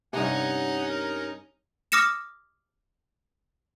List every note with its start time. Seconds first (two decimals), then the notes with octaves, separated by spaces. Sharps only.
0.13 G2 C3 C#4 D#4 F#5 G#5
0.89 A#4
1.92 D6 D#6 F6 A#6 C#7 E7